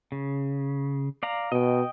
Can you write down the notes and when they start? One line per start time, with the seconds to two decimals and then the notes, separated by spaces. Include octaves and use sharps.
0.12 C#3
1.23 D5 F5 A#5
1.52 B2 D#5 G5